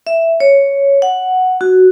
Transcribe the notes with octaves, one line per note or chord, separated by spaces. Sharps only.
E5
C#5
F#5
F#4